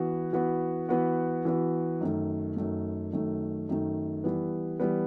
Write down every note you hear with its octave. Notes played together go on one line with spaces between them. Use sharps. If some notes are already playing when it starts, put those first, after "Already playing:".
Already playing: E3 B3 F#4
E3 B3 F#4
E3 B3 F#4
E3 B3 F#4
F#2 D#3 A3
F#2 D#3 A3
F#2 D#3 A3
F#2 D#3 A3
E3 G3 B3
E3 G3 B3